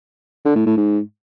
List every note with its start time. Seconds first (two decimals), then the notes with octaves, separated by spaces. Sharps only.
0.45 D3
0.56 A2
0.66 A2
0.77 G#2